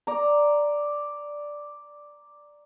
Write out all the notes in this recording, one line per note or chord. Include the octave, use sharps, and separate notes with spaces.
D5 A#5